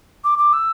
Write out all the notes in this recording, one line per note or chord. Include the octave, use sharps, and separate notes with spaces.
D6
D6
E6